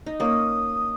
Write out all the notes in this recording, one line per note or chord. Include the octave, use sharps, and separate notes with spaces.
D#4
A#3 C#4 D#6